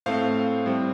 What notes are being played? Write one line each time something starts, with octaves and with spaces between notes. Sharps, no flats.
A2 A3 C4 C5 F5
A2 G3 C4